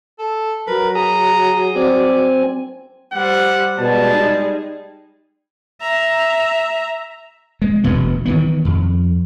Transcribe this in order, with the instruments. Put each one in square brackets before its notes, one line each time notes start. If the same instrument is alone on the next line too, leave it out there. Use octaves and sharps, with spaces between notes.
[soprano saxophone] A4
[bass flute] F#3 [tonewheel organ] A#4 [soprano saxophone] B4
[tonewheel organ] G#4 D#6 [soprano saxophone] A#5
[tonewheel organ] C4 G#5 [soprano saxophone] D5
[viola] G3 C5 [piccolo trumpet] F#5
[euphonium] B2 [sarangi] G3 [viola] G#3 G#4 [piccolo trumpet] A5
[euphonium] D#4
[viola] E5 A#5
[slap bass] G#3
E1 D2 B2 B3
D#3 E3 B3
F2